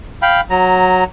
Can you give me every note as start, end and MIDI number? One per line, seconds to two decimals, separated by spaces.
0.22 0.41 77
0.22 0.41 79
0.22 0.41 83
0.50 1.04 54
0.50 1.04 82